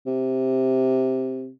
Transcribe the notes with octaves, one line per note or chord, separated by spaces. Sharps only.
C3